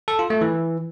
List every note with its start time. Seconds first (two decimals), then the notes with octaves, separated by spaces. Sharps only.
0.08 A4
0.19 F4
0.30 A3
0.41 E3